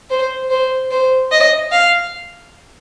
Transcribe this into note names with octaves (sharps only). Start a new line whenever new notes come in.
C5
C5
C5
D#5
F5